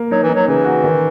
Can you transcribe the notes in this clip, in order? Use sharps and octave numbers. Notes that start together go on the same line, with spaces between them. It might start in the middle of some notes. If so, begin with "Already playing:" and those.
Already playing: A#3
F#3 D#4
E3
D#4
F#3
C#3 E3
F#4
D#3